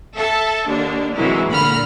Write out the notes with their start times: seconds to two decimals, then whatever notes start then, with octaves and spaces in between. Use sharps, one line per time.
0.15 A4 E5 A5
0.68 D#2 D3 D4
1.15 C3 E3 F#3 G#3 A#3 E4
1.50 A#2 D3 A#5 B5 F6